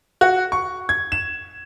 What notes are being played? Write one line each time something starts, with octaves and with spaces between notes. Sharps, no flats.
F#4
C#6
G#6
E7